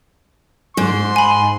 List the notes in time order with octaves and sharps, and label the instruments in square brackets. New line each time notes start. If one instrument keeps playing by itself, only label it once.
[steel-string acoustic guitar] G#2 [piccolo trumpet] C6
[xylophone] G#5 B5